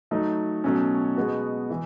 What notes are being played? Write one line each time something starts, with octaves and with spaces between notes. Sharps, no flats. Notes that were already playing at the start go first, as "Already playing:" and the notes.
F#3 A3 D#4
B2 F#3 A3 C#4
B2 G#3 B3 F#4
E3